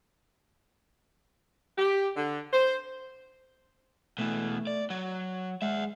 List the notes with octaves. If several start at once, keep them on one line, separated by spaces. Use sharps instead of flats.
G4
D3
C5
B2 E3 A3
D5
F#3 F#5
G#3 E5 F#5